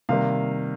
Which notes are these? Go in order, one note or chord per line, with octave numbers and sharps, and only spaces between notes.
C3 D#3 G3 A#3 F5